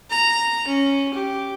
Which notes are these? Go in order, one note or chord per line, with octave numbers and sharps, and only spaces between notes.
A#5
C#4
G4